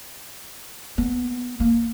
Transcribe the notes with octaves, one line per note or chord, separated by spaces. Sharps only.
B3
A#3